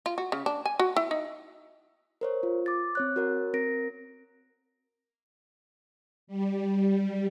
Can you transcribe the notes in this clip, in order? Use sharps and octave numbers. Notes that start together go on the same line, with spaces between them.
F4
F#4
C#3
D4
G#5
F#4
E4
D#4
A#4 C5 C#5
F4
D6 A6
C4 C#5 F#6
F#4 A#4 C#5
C4 A#4 A#6 D7
G3